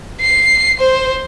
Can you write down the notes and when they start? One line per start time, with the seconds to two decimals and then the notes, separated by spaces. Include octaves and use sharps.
0.21 C7
0.80 C5